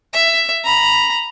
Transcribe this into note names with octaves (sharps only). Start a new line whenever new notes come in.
E5
A#5 B5